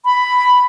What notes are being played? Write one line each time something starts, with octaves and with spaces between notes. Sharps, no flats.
B5